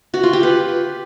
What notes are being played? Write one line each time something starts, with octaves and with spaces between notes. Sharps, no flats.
F#4
F4
G4
B4